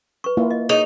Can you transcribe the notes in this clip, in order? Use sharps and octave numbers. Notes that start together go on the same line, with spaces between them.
B4 C#6
A#3 E4 F4
D#5
D#4 G#4 C#5 C#6